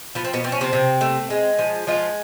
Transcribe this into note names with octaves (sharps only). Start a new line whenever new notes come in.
F3 B3
C4
B2 B3
F3 C4
C#4
C3 C4
C3
A3
G#3
F3
F3 G#3 F4